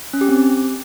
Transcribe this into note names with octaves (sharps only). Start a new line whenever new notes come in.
C#4
G4
C4
G4